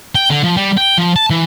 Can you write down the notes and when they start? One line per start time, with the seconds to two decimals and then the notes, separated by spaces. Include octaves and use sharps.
0.15 G5
0.30 D3
0.44 F3
0.56 G3
0.77 G5
0.98 F3
1.16 A5
1.30 E3